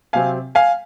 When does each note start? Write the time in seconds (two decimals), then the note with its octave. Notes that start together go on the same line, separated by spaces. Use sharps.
0.13 C3 F#3 C4 F5 G#5
0.55 F5 G#5